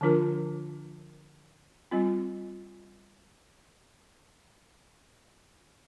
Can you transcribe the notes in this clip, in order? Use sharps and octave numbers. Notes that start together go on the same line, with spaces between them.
D3 F3 D4 F4 A#4
G3 C4 F4